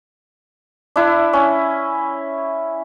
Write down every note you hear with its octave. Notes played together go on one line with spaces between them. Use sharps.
D4 E4
C#4